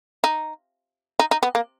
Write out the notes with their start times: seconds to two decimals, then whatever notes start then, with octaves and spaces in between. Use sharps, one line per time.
0.24 D#4
1.19 D#4
1.31 D#4
1.43 B3
1.55 A#3